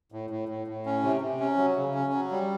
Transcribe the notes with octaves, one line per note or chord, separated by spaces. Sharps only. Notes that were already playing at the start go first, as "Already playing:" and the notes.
A2
A2
A2
A2
C#4
C3
C3
C#4
F#3
C#3
C#4
F#3
G3